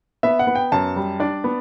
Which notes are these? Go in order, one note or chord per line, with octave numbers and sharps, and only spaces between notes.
B3 E5
F#5
B3
G5
F#2 A5
G3
D4 D5
B3